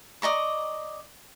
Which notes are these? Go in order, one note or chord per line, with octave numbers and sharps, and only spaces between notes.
D5 D#5 A#5 C#6